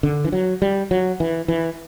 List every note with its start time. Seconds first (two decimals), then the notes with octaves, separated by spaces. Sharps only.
0.03 D3
0.24 E3
0.32 F#3
0.62 G3
0.91 F#3
1.20 E3
1.48 E3